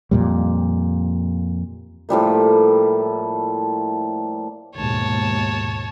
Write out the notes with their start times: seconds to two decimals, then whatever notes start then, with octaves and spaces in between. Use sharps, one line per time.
0.11 F2 A#2 G3
2.09 A2 F3 G3 A#3
4.76 D#2 G#2 B2 C#5 A5